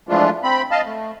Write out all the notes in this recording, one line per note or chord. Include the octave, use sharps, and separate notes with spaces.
E3 F3 G#3 A3 D4 F4
C4 B5
D#5 F5 A5
A3